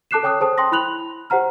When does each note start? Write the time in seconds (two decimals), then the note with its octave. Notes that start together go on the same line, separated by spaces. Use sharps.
0.11 A4 A5 D6 F#6 C7 E7
0.23 A4 C#5 G5 D6 D#6 F#6
0.40 G#4 C5 A5 D#6
0.58 G5 C6 D#6 A#6
0.72 E4 B5 F#6 F7 F#7
1.30 G4 C5 F#5 A#5 F6